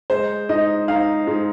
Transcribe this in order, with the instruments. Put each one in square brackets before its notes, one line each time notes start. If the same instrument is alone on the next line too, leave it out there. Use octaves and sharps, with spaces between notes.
[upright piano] G#3 C5
G#2 D#5
D#4 F5
G#2